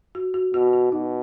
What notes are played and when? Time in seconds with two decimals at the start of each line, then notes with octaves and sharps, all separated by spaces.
0.15 F#4
0.34 F#4
0.54 B2 F#4
0.73 F#4
0.92 B2 D#4